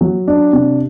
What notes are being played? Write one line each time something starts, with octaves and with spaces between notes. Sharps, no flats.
F#3
D4
C3